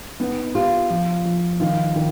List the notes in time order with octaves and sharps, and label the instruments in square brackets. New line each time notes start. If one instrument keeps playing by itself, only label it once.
[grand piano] B3 [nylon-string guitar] D#4
[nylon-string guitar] F4 [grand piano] G4
[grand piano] F3
F3
[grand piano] D#3 [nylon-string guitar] F4
[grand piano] D#3